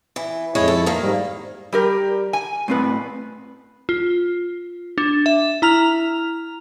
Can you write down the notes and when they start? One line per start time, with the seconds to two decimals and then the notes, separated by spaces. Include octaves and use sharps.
0.16 E3
0.55 F2 G#3 E4 C#5
0.68 A4
0.86 D#3 A#3
1.00 G#2 G3
1.73 G3 G4 A#4
2.33 G#5
2.68 A2 C4 B4
3.89 F4
4.98 D4
5.26 E5
5.62 E4 A#5 F6 F7